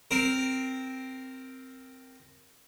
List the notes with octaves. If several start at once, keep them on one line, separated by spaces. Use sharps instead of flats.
C4 A#4